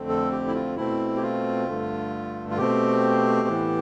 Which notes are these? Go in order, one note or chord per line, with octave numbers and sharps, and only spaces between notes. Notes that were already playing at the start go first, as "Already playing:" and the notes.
Already playing: F2 D3 A3 C4
A4
G4
E4
F4
B2 A3 C4 E4
G4
F4
G2 D3 A3
F4
B2 A3 C4 G4
A2 E3 B3